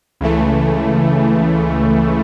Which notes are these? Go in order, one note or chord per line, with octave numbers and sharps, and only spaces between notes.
C#2 C#3 E3 A3